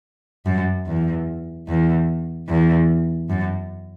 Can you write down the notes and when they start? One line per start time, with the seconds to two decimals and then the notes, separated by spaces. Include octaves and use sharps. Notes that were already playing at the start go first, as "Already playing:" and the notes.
0.46 F#2
0.87 E2
1.68 E2
2.49 E2
3.30 F#2